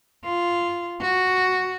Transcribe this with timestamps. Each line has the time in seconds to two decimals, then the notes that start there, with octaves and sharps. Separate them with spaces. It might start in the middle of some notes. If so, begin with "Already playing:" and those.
0.25 F4
1.01 F#4